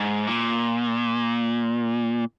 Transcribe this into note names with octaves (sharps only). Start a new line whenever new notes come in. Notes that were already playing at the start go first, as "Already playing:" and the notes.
Already playing: G#2
A#2